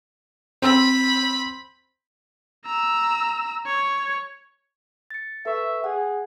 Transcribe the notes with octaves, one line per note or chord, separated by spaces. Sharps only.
C4 B5 E6
A#5 E6
C#5
A6 C#7
A4 B4 E5 C#6
G#4 F#5